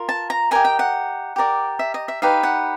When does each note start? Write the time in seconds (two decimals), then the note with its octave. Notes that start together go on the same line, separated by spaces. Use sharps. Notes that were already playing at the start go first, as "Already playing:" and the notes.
Already playing: F4 A#4
0.09 A5
0.30 A#5
0.51 G4 A#4 D#5 G#5
0.65 G5
0.79 F#5
1.36 G4 A#4 D5
1.79 E5
1.94 D#5
2.08 E5
2.22 D#4 G4 B4 F5
2.43 F#5